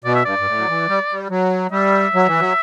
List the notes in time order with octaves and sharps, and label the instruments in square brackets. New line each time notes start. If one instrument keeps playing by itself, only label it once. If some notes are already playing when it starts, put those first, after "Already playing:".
[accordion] B2 [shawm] D5
[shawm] E5
[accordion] G2 [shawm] D5
[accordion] G2
A2
F#3
E3
G3
G3
F#3
[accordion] G3 [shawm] E5
[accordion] F#3
E3
F#3